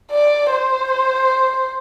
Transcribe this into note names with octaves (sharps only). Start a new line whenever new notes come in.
D5
C5